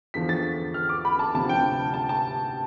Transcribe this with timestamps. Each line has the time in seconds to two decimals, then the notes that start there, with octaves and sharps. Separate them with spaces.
0.14 E2 D3 F3 B6
0.29 A6
0.74 F6
0.89 D6
1.05 B5
1.19 A5
1.34 D2 C3 F3 A5
1.49 G5
1.94 A5
2.09 A5